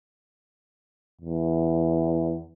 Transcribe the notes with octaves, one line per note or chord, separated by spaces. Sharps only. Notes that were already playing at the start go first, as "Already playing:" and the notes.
E2